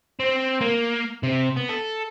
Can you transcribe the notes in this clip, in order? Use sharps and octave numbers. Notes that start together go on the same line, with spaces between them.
C4
A#3
C3
B3
A4